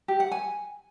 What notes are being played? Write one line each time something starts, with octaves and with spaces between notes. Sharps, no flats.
G4
F#5
G#5